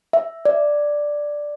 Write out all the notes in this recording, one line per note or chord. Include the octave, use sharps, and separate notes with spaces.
E5
D5